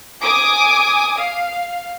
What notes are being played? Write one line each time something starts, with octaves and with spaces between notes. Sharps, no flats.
G#5 D6 D#6
F5